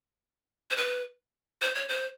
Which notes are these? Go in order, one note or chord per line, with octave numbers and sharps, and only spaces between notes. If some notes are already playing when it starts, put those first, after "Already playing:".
C5
B4
C5
C#5
C5